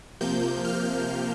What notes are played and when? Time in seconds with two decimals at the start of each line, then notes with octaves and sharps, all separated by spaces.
0.21 C3 F3 A#3 G6
0.65 F6